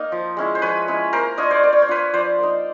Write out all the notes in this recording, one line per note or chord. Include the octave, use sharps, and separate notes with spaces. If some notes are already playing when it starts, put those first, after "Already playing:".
Already playing: A#3 D#4
F3
G#3 C#4 E4
C5
F3 B4 C#5
G#3 C#4 E4
A#3 A#4 C5
D4 F4 C#5 D#5
C5 D5
A#3 D5
C#5
C5
D4 F4 B4 C#5
F3 C5 D5
A#3 D#4